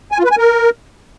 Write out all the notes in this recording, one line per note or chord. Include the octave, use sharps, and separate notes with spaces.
G#5
F4
B4
G#5
A#4